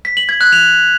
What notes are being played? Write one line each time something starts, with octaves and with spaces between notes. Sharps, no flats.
B6
F#7
G#6
F#6
F7